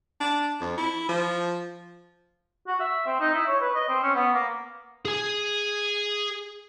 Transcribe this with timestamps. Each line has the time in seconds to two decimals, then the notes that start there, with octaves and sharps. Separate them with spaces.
0.20 D4
0.61 F2
0.78 E4
1.09 F3
2.68 F#4
2.80 E5
3.06 C4
3.20 D#4
3.34 E4
3.47 C#5
3.61 B4
3.75 D#5
3.89 C4
4.03 C#4
4.15 B3
4.33 A#3
5.05 G#4 G#5